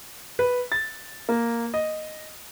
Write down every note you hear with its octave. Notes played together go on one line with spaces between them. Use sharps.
B4
A6
A#3
D#5